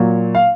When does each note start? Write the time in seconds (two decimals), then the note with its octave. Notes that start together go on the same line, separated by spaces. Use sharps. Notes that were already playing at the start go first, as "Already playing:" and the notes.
Already playing: A#2 F#3
0.35 F5